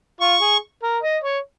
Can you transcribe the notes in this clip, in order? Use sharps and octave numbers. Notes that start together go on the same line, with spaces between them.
F4 C#6
G#4
A#4
D#5
C#5